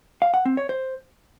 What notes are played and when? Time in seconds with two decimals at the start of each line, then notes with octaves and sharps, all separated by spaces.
0.22 F5
0.34 F#5
0.45 C4
0.57 C#5
0.69 C5